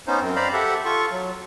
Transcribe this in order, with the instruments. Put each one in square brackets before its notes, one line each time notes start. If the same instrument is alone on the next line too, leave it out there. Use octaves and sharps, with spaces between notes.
[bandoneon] B3 C#4 D#4 C5
F#2 C4
C5 D5 F5 A#5 B5
G4 A4 E5 F#5
F4 A4 C#6
F#3